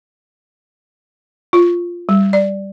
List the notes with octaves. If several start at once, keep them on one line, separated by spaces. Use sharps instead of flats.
F4
G3
D5